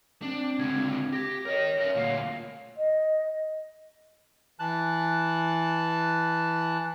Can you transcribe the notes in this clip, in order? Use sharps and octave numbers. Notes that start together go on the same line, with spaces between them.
C4 D4
C#2 D3 G#6
G4 A#6
A#4 C#5 D#5
A#4 E5
D2 A#2 F5
D#5
E3 A5 F#6